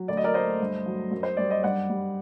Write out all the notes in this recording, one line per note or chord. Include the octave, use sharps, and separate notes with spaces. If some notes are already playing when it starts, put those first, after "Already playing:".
Already playing: F#3
D2 D5
D#5
A#4 D5
A3 C5 D#5
G2
F#3
F#2
C5
G3 D5
D#5
G2 D5 F#5
G3